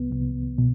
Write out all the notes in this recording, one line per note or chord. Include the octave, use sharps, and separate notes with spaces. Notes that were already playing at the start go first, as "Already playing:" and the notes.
Already playing: C2 B3
C2
B2